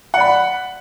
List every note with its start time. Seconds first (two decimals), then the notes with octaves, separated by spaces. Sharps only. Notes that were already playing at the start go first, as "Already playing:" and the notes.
0.14 F#5
0.17 D5
0.20 B5